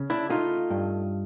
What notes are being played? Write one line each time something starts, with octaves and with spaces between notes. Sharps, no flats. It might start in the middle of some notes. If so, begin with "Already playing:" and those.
Already playing: C#3
D4 E4
A3 D#4 F4
G2